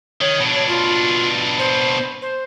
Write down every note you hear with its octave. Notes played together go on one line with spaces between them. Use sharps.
D#3 C#5
B2 D4
C#5
F4
C5
C5